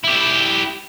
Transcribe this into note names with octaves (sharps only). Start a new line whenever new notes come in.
E4 G4